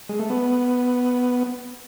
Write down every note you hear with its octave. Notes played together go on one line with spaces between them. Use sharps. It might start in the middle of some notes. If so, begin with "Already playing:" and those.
G#3
A3
B3